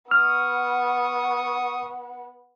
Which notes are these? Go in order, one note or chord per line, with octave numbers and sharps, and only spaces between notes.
B3 F#5 C#6 D#6 F6